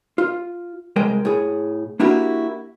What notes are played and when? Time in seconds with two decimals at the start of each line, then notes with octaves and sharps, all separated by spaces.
0.18 F4
0.96 C2 G#3 A#4 G5
1.25 A2 G#4
2.00 A#3 D4 E4 F#4 G4 A#4